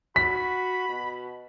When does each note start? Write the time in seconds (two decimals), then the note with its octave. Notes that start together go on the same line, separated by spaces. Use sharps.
0.16 F#4 B5 B6
0.89 B2